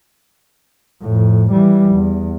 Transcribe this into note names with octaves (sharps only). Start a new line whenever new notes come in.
F2 A2
E3 G3
E2